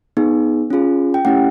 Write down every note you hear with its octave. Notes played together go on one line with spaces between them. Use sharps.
B3 D#4 G#4
C#4 F4 G#4
G5
A3 C#4 E4 G4 F#5